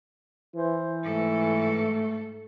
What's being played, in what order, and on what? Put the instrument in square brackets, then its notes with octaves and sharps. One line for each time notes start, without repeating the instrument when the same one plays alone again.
[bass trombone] E3 [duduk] C5
[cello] G#2 A4 [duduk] A3